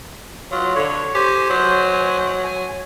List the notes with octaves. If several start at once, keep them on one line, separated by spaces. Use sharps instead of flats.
F#3 F4
D3 C#5
G4 C5 G#5
F#3
G#5